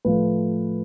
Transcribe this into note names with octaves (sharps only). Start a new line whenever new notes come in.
A2 F3 A3 B4